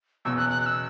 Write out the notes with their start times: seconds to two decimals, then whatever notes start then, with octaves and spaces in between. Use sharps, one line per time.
0.25 F#1 E2 B2 E6
0.37 F#6
0.49 F#6
0.61 F#6
0.66 E6